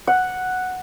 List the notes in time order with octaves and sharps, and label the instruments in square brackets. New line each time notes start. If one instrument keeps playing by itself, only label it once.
[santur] F#5